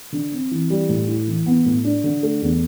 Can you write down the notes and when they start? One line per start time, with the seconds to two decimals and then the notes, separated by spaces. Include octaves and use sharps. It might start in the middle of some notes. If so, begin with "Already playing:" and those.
0.12 D3
0.32 C4
0.51 E3
0.70 G3
0.89 A2
1.08 E4
1.27 E3
1.46 B3
1.66 A2
1.84 D4
2.04 D3
2.23 A3
2.42 E2